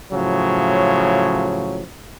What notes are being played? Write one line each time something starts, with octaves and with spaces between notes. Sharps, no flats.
A2 C#3 F3 F#3